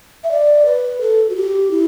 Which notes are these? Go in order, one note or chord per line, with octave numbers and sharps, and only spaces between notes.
E5
D5
B4
A4
F#4
G4
E4